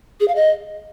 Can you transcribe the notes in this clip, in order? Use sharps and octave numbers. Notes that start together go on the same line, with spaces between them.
G#4
F5
D#5